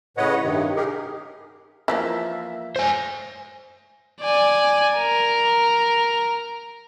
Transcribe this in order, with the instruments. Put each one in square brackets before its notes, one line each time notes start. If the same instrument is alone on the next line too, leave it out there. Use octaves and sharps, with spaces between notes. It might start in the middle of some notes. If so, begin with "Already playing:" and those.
[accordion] A2 C#3 B4 C#5 D#5 F#5
G2 C3 D#3
D#4 G4 G#4 A#4
[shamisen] E3 F3 A#3 [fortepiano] E5
[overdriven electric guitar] C5 G#5
[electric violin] D5 G#5
A#4